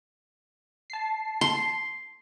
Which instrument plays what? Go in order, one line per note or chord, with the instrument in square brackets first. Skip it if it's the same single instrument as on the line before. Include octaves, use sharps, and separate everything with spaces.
[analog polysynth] A5 C7
[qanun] C6